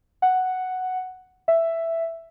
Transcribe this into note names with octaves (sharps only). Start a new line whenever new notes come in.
F#5
E5